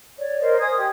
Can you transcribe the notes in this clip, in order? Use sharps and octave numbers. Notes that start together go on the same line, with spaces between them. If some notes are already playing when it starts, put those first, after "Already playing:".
C#5 D5
A#4 C5 D#5
G#5 D#6 G#6
G4